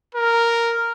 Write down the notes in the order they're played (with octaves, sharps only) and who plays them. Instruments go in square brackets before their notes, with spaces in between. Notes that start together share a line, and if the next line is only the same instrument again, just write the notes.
[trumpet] A#4